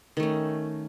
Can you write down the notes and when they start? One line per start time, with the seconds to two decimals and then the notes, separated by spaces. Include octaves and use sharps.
0.17 D#3
0.20 A3
0.23 C#4